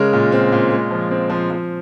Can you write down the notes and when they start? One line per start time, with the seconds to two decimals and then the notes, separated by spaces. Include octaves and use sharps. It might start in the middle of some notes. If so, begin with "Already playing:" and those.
Already playing: C#3 G#3 A#4 C#5
0.13 A#2
0.32 C4
0.52 A#2
0.71 G#3
0.91 F3
1.11 C4
1.30 F3
1.50 F3